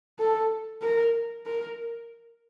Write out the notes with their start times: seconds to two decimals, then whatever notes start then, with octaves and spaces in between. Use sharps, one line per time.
0.19 A4
0.82 A#4
1.46 A#4